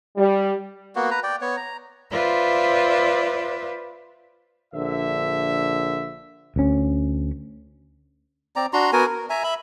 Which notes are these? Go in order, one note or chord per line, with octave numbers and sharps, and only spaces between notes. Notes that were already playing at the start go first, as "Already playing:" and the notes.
G3
A#3 B3 F#4
B4 A#5
D5 G5
B3 C#5
A#5
F4 B4 C5 D5 E5
A#1 D3 E5
D2 C#4
C4 D5 A#5
D4 F#4 A#5 C6
B3 F#4 A#4 G#5
A#4
E5 G#5 A#5
E5 B5